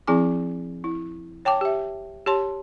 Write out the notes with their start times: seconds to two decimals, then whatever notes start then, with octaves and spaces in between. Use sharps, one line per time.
0.07 F3 C4 E4 G#4 G#5 D6
0.84 E4
1.45 C#5 G5 A5 D6
1.61 G4 E5
2.26 G4 C#5 A5 C6